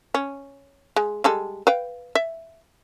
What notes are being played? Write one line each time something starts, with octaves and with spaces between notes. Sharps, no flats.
C#4
G#3
G3 G#3 A4
B4 F5 G5
E5